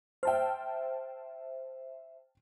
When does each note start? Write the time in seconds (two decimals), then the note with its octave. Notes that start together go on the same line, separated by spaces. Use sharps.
0.23 C5 E5 G5 A5 F6